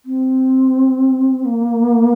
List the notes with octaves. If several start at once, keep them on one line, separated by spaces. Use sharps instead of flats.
C4
A#3